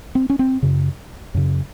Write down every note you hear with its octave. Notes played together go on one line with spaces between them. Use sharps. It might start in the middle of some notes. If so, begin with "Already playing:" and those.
C4
C#4
C4
F#2 C#3
F#2 C#3